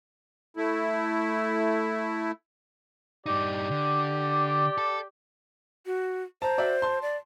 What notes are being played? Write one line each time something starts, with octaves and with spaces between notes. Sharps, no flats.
A3 E4
G2 D#4 G4 D5
D3
A4
F#4
C5 A5 A#5
F#4 D5 E5
A5 C6
D5